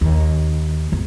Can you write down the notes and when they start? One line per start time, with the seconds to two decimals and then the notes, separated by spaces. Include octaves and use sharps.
0.01 D#2
0.92 G#1 E2